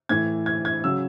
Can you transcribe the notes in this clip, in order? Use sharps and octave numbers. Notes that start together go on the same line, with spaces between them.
A2 E3 G#6
G#6
G#6
C#3 F#3 E6